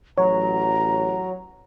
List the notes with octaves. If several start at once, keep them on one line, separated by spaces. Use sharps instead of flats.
A1 F#3 C#5 A#5